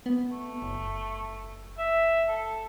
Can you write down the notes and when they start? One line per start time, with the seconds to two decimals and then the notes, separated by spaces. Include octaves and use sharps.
0.06 B3
0.31 A3
0.62 F#1
1.78 E5
2.28 A4